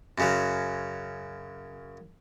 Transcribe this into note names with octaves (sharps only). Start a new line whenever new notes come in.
F#2 C#3 F#3